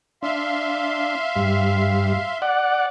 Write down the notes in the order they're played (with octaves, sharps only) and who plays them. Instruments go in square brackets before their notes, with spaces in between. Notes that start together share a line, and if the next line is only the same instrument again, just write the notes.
[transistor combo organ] D4 [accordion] E5 F5 C6
[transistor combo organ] G2
D5 F#5